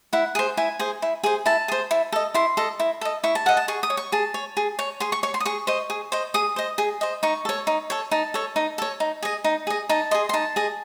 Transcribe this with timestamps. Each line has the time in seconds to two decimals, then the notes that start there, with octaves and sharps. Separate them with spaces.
0.13 E4 F#5
0.35 G#4 C5
0.57 E4 G#5
0.79 G#4 C5
1.02 E4
1.23 G#4 C5
1.46 E4 A5
1.68 G#4 C5
1.91 E4
2.12 A4 D#5
2.34 E4 C6
2.57 A4 D#5
2.79 E4
3.01 A4 D#5
3.24 E4 C#6
3.35 A5
3.46 A4 D#5 F#5
3.57 A5
3.68 G#4 C#6
3.83 D#6
3.90 C#5
3.97 C#6
4.12 G#4 A5
4.34 C#5
4.57 G#4
4.79 C#5
5.00 G#4 C6
5.12 C#6
5.23 C#5 C#6
5.34 C6
5.40 D#6
5.45 G#4 C#6
5.67 C5 D#5
5.90 G#4
6.12 C5 D#5
6.34 G#4 D#6
6.56 C5 D#5
6.78 G#4
7.01 C5 D#5
7.23 D#4 C#6
7.45 A4 C#5
7.67 D#4
7.90 A4 C#5
8.11 D#4 A5
8.34 A4 C#5
8.56 D#4
8.78 A4 C#5
9.00 D#4
9.22 G#4 D#5
9.44 D#4
9.67 G#4 D#5
9.89 D#4 A5
10.11 G#4 D#5 C6
10.29 C6
10.33 D#4 A5
10.56 G#4 D#5